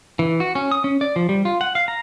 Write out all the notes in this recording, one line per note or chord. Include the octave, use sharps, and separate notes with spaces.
E3
F#4
C#4
D#6
C#4
D5
F3
G3
F4
F#5
F5
A#5